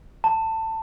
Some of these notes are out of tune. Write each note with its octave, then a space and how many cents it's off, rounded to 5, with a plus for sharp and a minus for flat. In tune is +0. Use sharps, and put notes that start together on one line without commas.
A5 +20